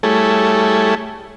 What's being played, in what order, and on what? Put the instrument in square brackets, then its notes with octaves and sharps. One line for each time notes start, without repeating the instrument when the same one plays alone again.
[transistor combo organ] G3 A3 E4 G#4 A4 C#5